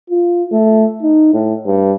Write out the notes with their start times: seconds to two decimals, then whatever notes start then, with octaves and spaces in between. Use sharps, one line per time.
0.10 F4
0.52 A3
1.02 D#4
1.34 A2
1.66 G2